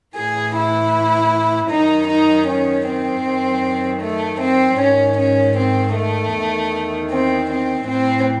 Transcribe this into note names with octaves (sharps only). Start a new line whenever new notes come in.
A2 E3 G#4
E4
F#2 D#3 D#4
D#4
C#4
C4
F#2 D#3
A3
C4
G#2 D#3 C#4
C#4
C4
A3
E2 D#3
C4
C4
A2 E3 C4